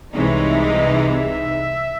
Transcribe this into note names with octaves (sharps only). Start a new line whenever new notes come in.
C2 C3 E3 G#3 D#4 C#5
D#5
E5